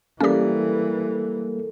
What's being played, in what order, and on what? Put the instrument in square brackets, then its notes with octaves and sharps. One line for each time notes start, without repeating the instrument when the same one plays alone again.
[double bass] E3 [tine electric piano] G3 A#3 [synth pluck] C#4 G4 [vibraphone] A4 A#4